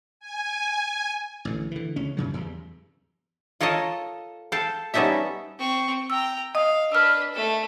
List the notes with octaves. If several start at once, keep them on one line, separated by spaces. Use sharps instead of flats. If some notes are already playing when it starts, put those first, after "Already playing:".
G#5
A1 D3
D3 E3
C#2 C#4
F#2 C#3 F#3
E2 G2
F4 A4 A#4 C#5 D#5
A4 F5 G5 A5
G3 B3 C#4 D#4 A4 E5
C4 C#6
G5 A#5 E6
D#5 F5 D#6
D4 B4 E6 F6
A3 A4